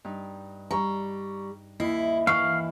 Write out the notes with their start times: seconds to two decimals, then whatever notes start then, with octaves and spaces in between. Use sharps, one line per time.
0.04 G2 D#4
0.71 G3 A#5 C#6
1.80 D#2 E4 D#5 E5 C7
2.27 E3 F5 C#6